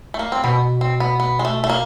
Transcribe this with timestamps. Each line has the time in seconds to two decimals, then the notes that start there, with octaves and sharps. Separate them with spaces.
0.14 A3
0.19 A#3
0.32 C4
0.44 B2 B3
0.81 C4
1.00 B3
1.20 B3
1.39 G#3
1.45 A3
1.64 A3
1.70 A#3